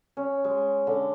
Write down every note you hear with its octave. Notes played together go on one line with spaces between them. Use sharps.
C#4
G#3
D3